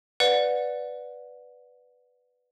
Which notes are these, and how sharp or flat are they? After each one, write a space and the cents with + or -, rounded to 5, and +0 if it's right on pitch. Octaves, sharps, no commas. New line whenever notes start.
B4 +5 D5 +0 F#5 -25